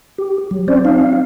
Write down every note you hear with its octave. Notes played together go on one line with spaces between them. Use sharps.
G4
F#3
C4 C#4 C5 D5
C4 D#4 F5